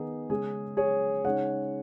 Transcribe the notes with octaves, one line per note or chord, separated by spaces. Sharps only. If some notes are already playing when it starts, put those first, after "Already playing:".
Already playing: D#3 B3 D#4 G#4
C#3 G#3 C#4 G#4
G#4 C#5
C#3 G#3 D#4 C#5 F#5